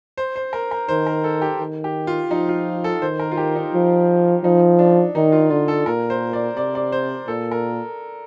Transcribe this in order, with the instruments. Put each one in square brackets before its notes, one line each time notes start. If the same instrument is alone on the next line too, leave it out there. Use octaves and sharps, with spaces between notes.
[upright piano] C5
C5
A#4
A#4
[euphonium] D#3 [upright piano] C5
[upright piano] A#4
A4
G4
[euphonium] D#3
[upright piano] G4
F4
[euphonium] F3 [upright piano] D#4
[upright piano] F4
A4
[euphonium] D#3 [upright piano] C5
[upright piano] A#4
F4
G4
D#4
[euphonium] F3
[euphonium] F3 [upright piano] D#4
[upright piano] D4
[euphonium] D#3 [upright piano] D#4
[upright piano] F4
[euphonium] D3 [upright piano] F4
[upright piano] A4
[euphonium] A#2 [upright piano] A#4
[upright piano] C5
D5
[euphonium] C3 [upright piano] D5
[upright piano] D5
C5
[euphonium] A#2 [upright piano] A4
[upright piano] A#4